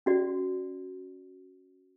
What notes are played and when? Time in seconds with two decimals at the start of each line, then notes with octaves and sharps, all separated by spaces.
0.06 C#4 F#4 D5